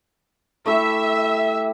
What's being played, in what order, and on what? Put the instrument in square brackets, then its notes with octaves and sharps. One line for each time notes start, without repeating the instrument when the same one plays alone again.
[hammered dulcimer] A3 E4 G4 [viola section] E5